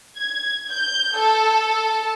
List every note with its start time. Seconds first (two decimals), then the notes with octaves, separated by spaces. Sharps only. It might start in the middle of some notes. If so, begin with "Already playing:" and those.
0.18 G#6
0.71 G6
1.16 A4